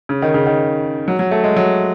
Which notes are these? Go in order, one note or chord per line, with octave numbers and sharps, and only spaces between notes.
C#3
D#3
C#3
D#3
F#3
F#3
A3
G#3
F#3